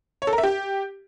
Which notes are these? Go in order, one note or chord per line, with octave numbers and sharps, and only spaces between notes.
C#5
A4
A#4
E5
G4